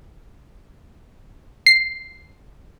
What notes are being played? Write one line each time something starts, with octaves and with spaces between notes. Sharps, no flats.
C7